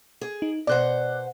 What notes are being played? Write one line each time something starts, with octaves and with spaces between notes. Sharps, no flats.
G#4
D#4
B2 C5 D5 F#5 F#6